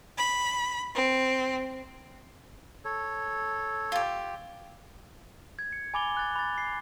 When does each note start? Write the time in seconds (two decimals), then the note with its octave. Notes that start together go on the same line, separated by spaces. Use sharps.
0.17 B5
0.95 C4
2.85 A4 C#5
3.92 F4 G4
5.59 G#6
5.73 C#7
5.94 G#5 B5 D6 A6 F7 G7
6.17 F#6 A6
6.36 B5 A6
6.58 C7